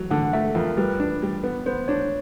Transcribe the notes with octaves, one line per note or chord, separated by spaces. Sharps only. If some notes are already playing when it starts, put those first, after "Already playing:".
Already playing: F#3
D3 F#5
A3 E5
A4
F2 A#4
G3 B4
D4
G3
B3
B3 C5
D4 C#5